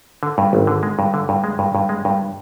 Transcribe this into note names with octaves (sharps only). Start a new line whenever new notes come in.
D3
G2
G#1
D3
G#3
G2
D3
G2
G#3
G2
G2
G#3
G2